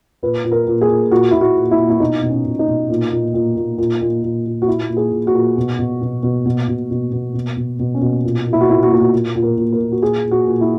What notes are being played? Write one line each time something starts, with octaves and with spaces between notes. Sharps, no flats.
A#2 B4
A#2
A#4
A#2
G#4
A#2
A#2 F#4
A#2 E4
F#4
A#2
E4
A#2
E4
B2 D#4
B2
C#4
B2
D#4
B2
A#2
A#2
A#2
A#2
A#2
A#2
A#2
A#2
F#4
A#2 E4
A#2
G#4
A#2
F#4
A#2
B2
B2
B2
B2
B2
B2
B2
B2
B2
B2
B2
C#4
B2
A#2
A#2
E4
F#4
A#2 E4
F#4
A#2 E4
F#4
A#2
A#2
A#4
A#2
A#4
A#2
F#4
A#2 G#4
A#2
F#4
A#2
E4